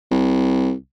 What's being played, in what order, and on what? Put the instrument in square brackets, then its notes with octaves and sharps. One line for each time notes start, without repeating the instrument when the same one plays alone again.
[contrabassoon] C2